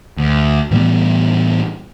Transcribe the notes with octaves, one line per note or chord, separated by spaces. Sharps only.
D2
A2 E3 G3 B3